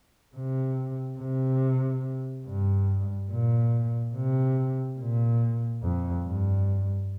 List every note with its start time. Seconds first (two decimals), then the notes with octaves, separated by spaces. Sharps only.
0.36 C3
1.19 C3
2.46 G2
3.30 A#2
4.15 C3
4.99 A#2
5.83 F2
6.25 G2